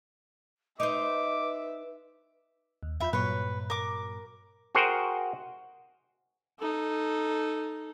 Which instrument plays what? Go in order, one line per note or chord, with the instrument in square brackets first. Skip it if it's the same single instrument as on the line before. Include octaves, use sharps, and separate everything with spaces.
[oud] D#4 C5 [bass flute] B4 [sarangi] E5 [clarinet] D6
[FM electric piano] D#2
[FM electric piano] F2 F4 G6 [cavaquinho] E5 B5
[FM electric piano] G2 A#2 F#3 [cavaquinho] B4 C#5
[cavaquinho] A#4 D6
[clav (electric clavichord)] F#4 G#4 A#4 C5 F#5 G5
[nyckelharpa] D#4 A4